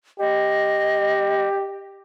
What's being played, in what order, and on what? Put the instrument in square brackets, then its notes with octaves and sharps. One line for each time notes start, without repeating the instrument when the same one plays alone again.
[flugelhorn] G4 [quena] D#5